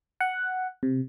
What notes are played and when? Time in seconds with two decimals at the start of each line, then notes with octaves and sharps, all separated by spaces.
0.20 F#5
0.83 C3